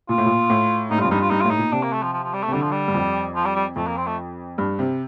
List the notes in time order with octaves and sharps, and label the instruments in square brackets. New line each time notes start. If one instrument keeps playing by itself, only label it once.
[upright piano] A#2 [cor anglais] F4
[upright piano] A2
A#2
A2
[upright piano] A2 [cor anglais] D#4
[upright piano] G2
[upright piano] F2 [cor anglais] F4
[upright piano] G2 [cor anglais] D#4
[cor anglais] F4
[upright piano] G2 [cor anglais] D#4
[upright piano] A2 [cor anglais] F4
[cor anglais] D#4
[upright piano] A#2
[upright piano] C3 [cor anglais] D4
[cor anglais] A#3
A3
F3
F3
F3
G3
A3
[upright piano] C3
[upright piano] D3 [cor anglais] G3
[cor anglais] F3
G3
[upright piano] G2
F2
[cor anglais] F3
G3
G3
[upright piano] F2 [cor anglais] A3
[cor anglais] A#3
C4
A3
[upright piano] G2
C3